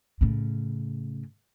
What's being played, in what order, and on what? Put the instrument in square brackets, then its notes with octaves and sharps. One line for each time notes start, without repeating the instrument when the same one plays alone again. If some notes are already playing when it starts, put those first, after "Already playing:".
[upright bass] A2 C#3